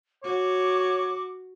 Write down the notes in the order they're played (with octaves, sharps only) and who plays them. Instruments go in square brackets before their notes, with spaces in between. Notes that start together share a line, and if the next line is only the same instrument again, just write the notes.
[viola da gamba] F#4 [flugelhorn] C#5 [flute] D6